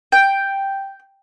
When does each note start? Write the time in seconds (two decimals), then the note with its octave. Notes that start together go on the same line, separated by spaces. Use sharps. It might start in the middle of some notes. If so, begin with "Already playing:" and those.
0.12 G5